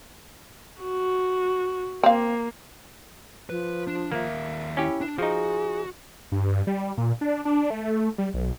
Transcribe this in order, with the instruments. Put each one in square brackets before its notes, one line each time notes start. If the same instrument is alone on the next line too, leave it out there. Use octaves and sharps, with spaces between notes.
[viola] F#4
[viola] A#3 [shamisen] C4 F5
[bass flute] F3 [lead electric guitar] B4
[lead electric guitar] D4
[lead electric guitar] D#2 E5 [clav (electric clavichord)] A#3
[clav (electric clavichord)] C#4 G4 [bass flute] E4
[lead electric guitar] D4
[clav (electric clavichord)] F3 D#4 [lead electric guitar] F#4 [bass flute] G#4
[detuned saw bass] G2
G3
A#2
D4
D4
A3
G3
B1